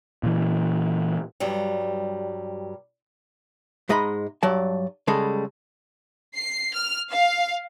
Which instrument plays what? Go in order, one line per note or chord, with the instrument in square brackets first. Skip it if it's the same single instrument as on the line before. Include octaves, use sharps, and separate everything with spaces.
[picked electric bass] A#2 E3
[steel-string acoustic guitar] G2 F#3 G3
[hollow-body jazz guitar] G#2 G#3 D#5 A#5 B5
G2 F#3 D5 A5
C#3 G3 G#3 A4
[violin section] C7
F6
F5